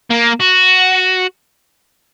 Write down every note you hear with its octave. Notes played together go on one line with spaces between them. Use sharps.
A#3
F#4